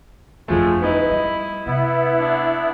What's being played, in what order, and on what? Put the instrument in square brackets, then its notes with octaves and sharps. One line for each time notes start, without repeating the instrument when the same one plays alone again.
[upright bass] G1 F2 [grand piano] D3 F3 A3 [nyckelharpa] G#3
[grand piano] B3 D#4 B4 [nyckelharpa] E4
[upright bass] G3 [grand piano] D#5
[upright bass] C3 [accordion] B3 E4
[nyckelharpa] D4